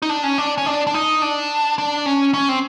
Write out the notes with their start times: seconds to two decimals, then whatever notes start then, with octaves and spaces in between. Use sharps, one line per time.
0.02 D#4
0.09 D4
0.23 C#4
0.38 D4
0.58 C#4
0.66 D4
0.87 D4
0.94 D#4
1.22 D4
1.78 D4
2.06 C#4
2.34 C#4
2.49 C4